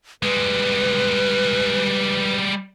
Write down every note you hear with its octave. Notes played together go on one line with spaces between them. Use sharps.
G3 G#3 B4